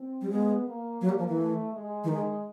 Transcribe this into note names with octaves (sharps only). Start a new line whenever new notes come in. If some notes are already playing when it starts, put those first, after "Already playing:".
Already playing: C4
G3
G#3 B3
A#3
F#3 A#3
G3
F3
E3
A3
G#3
E3
D#3 G#3